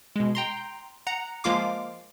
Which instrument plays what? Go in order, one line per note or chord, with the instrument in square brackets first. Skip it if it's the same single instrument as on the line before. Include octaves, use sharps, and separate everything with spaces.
[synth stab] B2 G#3
G5 A#5 C6
F#5 A#5
F3 G#3 A#3 F4 F5 D6